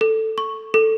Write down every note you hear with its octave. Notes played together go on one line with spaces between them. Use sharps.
A4
C#6
A4